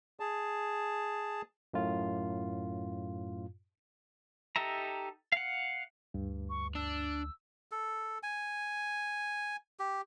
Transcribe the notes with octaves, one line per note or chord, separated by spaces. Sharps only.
G#4 A5
F#2 A2 F4
D#4 G4 A4 E5 A#5
F5 F#5
D2 G2
C#6
D4 E6
A4
G#5
G4